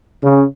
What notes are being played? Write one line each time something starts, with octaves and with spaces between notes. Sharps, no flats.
C#3